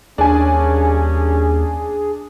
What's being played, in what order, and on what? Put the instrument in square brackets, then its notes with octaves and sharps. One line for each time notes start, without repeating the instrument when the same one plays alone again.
[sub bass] D#2 [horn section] G3 A#3 C#4 [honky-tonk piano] D4 G#5 [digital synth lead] G#4